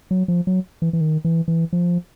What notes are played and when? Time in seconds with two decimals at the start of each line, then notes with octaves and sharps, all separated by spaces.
0.11 F#3
0.28 F3
0.47 F#3
0.82 E3
0.93 E3
1.01 D#3
1.25 E3
1.48 E3
1.73 F3